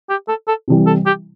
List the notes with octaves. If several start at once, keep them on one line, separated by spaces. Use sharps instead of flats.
G4
A4
A4
C3 E3 G3
A4
G4